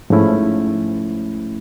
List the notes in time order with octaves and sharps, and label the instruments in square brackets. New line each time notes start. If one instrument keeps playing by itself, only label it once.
[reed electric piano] G#2 F3 A3 C#4 E4